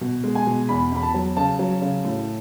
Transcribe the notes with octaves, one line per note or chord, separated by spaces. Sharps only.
B2
G#3
G#5
B2
E2 B5
E2 B5
A5
F#3
C#3 A5
F#3
C#3
A2